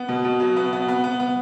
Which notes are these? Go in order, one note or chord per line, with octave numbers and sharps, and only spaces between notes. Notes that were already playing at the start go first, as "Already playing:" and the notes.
Already playing: B3
B2
B2
F#3
B3
B3
B3
B3
B3